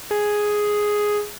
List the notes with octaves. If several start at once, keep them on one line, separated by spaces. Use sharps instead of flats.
G#4